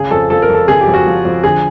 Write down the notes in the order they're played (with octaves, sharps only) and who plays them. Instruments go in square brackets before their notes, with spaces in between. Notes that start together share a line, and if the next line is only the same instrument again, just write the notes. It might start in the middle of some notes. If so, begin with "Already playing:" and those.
Already playing: [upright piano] C#3 G#4
F2 A4
F3 A4
A#4
F2 A4
C#3 G#4
G4
F2
F#4
F3
F2
D3 G#4